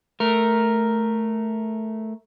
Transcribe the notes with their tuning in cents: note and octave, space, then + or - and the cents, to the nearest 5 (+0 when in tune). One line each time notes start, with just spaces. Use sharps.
A3 -5 A#4 +0